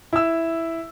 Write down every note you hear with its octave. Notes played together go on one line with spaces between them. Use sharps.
E4 E6